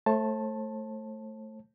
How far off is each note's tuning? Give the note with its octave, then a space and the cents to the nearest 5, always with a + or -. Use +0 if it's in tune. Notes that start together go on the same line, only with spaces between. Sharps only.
A3 +0 C5 +45 A5 +0